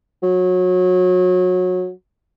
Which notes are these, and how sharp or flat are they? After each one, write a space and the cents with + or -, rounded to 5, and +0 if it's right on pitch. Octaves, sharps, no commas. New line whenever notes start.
F#3 -25